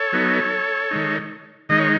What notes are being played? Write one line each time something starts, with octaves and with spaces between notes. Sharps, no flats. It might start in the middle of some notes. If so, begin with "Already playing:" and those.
Already playing: A4 C#5
F#3 B3 D#4
D#3 G#3 D#4
D#3 G#3 D#4 D#5
C#5